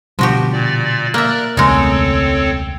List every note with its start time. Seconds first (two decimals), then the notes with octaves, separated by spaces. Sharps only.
0.19 B2 D3 F3 G3 F#4 G4
0.53 A#2 D5
1.14 A#3 A#4 D5 E5 F#6
1.57 E1 C#2 G#3 A3 C4 D#4 A4 C#5